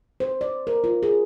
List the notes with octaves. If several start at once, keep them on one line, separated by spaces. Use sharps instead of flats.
C5
D5
A#4
F4
G#4